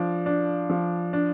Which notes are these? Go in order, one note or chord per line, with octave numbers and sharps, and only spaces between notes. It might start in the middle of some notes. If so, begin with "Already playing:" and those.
Already playing: F3 D4
D4
F3
D4